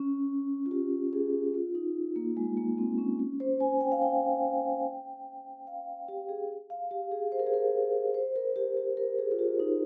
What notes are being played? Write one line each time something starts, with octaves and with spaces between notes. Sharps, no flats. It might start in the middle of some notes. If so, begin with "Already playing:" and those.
Already playing: C#4
F4
G4
G#4
F4
D#4
A#3
G#3
A#3
C4
C#4
C#4
C5
G#5
G5
F5
G5
F5
G4
G#4
F5
G4
G#4
C5
A#4
G#4
A#4
C5
A#4
G4
G4
A#4
G#4
F4
G4
D#4